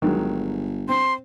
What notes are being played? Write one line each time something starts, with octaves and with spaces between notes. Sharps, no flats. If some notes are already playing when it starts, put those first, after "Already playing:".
G1 D#3 F#3 G#3
C4 C6